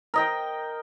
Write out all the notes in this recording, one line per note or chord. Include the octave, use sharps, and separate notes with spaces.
A#4 D#5 G5